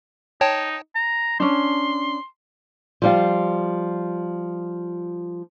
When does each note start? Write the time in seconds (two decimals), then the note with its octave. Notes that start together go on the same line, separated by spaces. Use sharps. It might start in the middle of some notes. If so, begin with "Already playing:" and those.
0.41 D#4 C#5 G5 A5
0.95 A#5
1.40 C#4 D4 C6
3.02 F3 G3 F4